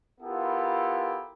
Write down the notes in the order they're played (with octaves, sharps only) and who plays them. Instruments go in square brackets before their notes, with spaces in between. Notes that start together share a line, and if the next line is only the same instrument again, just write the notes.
[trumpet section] B3 E4 F4 G4 A4 A#4